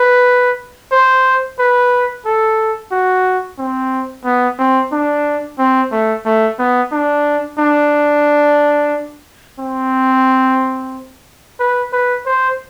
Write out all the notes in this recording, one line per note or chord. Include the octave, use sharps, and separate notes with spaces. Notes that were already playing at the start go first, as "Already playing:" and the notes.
Already playing: B4
C5
B4
A4
F#4
C4
B3
C4
D4
C4
A3
A3
B3
D4
D4
C4
B4
B4
C5